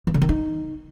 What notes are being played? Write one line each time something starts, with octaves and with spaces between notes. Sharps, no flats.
E3
D3
D#3
D#4